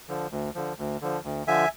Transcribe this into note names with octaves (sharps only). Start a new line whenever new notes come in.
D3 F3
D2
D3 F3
D2
D3 F3
D2
D3 F3 E5 G#5